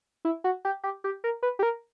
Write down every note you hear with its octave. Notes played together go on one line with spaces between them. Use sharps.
E4
F#4
G4
G4
G4
A#4
B4
G4
A#4